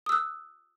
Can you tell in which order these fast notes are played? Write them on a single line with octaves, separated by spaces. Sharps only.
D#6 E6 F#6